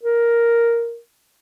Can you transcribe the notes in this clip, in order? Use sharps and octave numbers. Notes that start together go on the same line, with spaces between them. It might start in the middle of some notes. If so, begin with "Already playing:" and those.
A#4